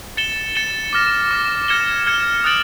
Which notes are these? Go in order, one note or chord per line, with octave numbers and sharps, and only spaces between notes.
A6 C#7 E7 G7
A6 C#7 E7 G7
D6 F6 A#6
D6 F6 A#6
F6 G#6 C#7 E7 G7
F6 G#6 C#7 E7 G7
D#6 F#6 A6 D7 F#7